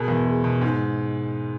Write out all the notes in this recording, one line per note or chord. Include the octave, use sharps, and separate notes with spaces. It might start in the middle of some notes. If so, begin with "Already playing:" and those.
Already playing: B2 G#4 A#4
E2
G#3
B2
G#2